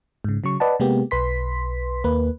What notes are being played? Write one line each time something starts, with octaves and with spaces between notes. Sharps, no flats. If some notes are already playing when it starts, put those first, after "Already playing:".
G#2 C#3
C#3 F#3 C#6
B4 D5 D#5 F#5 A5
C3 G#3 A#3 B3 G4
B1 B4 C6 B6
D#2 A#3 B4